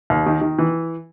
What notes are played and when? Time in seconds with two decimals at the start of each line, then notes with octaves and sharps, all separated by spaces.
0.10 D#2
0.26 D#3
0.41 D#3
0.58 E3